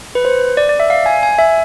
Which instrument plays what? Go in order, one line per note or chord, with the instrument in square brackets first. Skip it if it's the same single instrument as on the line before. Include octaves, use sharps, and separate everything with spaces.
[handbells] B4
C5
D5
D5
E5
F5
G#5
G#5
E5